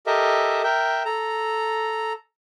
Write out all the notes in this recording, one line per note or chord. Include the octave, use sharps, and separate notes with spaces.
G4 A4 A#4 D#5 E5
A#4 E5 G5
A4 A#5